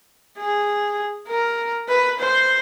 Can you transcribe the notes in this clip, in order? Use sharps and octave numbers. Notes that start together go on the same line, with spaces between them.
G#4
A#4
B4
C5